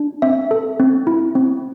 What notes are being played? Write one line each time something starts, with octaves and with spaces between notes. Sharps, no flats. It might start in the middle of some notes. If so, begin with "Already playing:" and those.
Already playing: D4
C4 E5
A4
C4
E4
C4